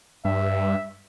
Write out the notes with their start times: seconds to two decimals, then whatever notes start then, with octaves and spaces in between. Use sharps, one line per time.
0.25 G2 E5